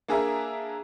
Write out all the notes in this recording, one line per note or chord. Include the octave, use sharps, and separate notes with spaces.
A#3 D4 G#4 A#4 E5 A#5